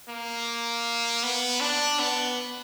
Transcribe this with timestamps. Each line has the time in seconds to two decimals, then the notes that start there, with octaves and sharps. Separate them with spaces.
0.09 A#3
1.23 B3
1.60 D4
1.99 B3